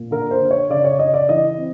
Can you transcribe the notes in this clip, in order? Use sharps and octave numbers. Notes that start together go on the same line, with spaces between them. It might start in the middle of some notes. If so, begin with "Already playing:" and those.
Already playing: A#2
D3 A#4
C5
D3
C#5
C#3 D5
C#5
C#3 D#5
D5
E3 D#5
C4